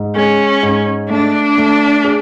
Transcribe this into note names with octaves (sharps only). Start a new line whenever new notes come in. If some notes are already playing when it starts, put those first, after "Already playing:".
Already playing: G#2
G#3 C#4
G#2
A3 D4
A3
G#4